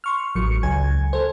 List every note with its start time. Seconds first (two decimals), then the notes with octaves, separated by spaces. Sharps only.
0.04 C6 C#6 F6
0.35 A1 F#3 C#6 C#7
0.63 C#2 G#5 G#6
1.13 A4 C5